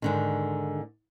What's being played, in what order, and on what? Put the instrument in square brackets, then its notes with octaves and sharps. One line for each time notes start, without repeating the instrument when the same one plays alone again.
[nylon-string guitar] G#2 D3 D#3